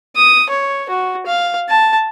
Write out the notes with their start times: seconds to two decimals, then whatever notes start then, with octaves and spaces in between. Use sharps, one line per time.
0.16 D#6
0.50 C#5
0.89 F#4
1.26 F5
1.69 A5